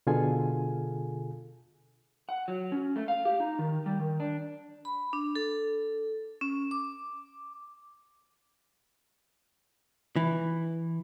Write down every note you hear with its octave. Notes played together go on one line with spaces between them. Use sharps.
B2 D3 F4 G#4 A4 G#5
F#5
F#3
C#4
A3
F5
G4
D#4
D#3
G3
D#3
D4
B5
D4
A4
C#4
D6
E3